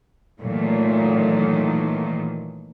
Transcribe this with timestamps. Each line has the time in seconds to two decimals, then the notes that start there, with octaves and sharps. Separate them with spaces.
0.41 A#2 D#3 E3 F#3 A3